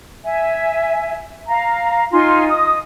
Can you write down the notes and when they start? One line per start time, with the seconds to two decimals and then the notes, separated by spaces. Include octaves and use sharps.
0.25 E5 G#5
1.48 F5 A#5
2.11 D#4 F4 G#5 C6
2.48 D#5 D#6